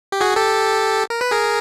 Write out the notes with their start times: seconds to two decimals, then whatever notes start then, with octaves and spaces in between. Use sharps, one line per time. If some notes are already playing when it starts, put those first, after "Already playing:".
0.12 G4
0.21 F#4 G#4
0.36 G4 A4
1.10 A#4
1.21 B4
1.31 G#4 A#4